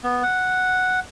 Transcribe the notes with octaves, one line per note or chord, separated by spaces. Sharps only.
B3
F#5